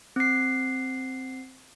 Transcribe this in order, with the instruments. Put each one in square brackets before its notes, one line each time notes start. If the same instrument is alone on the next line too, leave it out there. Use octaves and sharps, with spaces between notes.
[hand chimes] C4 C7